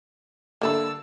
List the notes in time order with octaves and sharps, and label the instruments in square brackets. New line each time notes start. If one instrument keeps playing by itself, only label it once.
[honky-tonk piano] D3 A#3 [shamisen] G3 A3 B5 [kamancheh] A5 E6